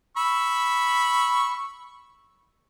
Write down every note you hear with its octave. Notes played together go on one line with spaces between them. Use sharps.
B5 C#6 E6